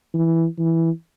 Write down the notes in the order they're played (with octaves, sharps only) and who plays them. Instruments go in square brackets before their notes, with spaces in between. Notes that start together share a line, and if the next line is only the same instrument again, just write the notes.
[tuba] E3
E3